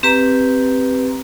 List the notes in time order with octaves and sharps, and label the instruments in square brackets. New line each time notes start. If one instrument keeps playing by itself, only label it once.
[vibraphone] C4 G4 B4 A#5